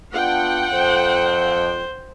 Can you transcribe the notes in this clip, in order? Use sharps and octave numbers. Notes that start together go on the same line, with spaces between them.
B3 D4 F4 F#5 G5
F2 C5